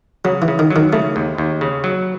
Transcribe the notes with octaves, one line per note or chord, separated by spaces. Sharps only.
C#3 F#3
E3
C#3
D#3
F#3
D#3
C#3 A3
D#2
D#2
C#3
F#3